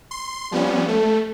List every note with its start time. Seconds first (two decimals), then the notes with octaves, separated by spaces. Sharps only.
0.11 C6
0.52 F3 G3 B3 C#4
0.88 A3 A4